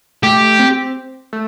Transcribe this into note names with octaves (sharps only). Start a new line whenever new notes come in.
A3 G4
C4
A3